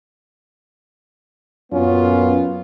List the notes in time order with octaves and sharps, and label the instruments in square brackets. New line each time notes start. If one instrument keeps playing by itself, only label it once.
[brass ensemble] F#2 A#2 B3 [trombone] C#4 [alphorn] F4